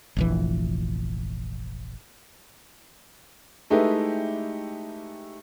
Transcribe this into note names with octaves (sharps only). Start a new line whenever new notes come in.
F1 A#1 E3
G#3 A3 D#4 E4 G4 B4